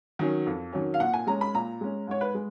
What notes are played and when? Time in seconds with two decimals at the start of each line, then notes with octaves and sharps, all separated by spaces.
0.19 D#3 F#3 C#4
0.46 F2
0.72 D#3 F#3 C#4
0.94 F5
0.99 A#2 F#5
1.14 G#5
1.27 G#3 C#4 A#5
1.41 B5
1.54 A#2 A#5
1.81 G#3 C#4
2.07 G#2 C#5
2.21 B4
2.34 G#3